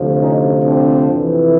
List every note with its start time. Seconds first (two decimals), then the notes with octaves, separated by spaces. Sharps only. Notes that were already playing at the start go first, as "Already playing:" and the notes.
Already playing: D2 C3 F3
0.21 C#4 D#4
0.64 C4 D4
1.08 F2 C3 E3